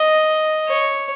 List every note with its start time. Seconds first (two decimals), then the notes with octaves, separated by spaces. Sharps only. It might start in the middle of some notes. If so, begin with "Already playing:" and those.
Already playing: D#5
0.68 C#5